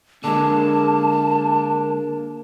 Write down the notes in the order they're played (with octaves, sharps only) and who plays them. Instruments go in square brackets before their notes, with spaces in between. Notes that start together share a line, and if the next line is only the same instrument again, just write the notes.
[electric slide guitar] D3 G#3 [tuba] A#3 [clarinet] D4 [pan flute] A5